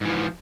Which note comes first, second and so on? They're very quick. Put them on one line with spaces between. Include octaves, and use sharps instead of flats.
G#2 E3 F3